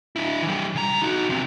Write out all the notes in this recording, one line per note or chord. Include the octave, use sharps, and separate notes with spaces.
D4 E4
E3 G3
C#3 A#5
D#4 F#4
E2 C3